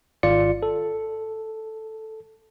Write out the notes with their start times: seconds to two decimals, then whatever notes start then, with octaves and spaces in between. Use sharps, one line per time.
0.23 G#1 F4 D5 C#7
0.63 A4